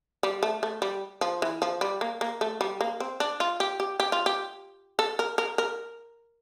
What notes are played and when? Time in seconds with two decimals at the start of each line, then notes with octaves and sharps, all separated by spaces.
0.23 G3
0.43 A3
0.63 A3
0.82 G3
1.21 F3
1.42 E3
1.62 F3
1.81 G3
2.01 A#3
2.21 A#3
2.41 A3
2.61 G3
2.81 A#3
3.00 C4
3.20 D4
3.40 F4
3.60 G4
3.80 G4
4.00 G4
4.12 F4
4.26 G4
4.99 A4
5.19 A#4
5.38 A#4
5.58 A#4